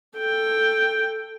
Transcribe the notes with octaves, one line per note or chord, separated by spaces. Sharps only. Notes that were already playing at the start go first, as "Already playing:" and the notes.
A4 G5